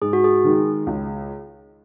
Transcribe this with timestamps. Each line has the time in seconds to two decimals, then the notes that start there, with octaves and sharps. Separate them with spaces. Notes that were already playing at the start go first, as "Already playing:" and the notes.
0.01 G#2 G#4
0.13 F#4
0.24 G#4
0.44 D#3 G#3 D#4
0.87 C#2